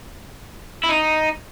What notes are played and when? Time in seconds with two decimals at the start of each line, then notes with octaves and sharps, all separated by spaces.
0.84 E4
0.89 D#4